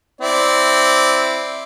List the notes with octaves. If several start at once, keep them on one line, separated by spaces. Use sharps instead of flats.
C4 E4 D5